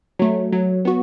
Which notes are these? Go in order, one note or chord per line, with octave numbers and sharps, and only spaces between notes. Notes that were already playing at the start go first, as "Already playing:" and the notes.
F#3 A3
F#3
B3 F#4